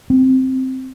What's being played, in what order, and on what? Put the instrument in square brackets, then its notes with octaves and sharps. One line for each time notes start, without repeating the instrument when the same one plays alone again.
[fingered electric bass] C4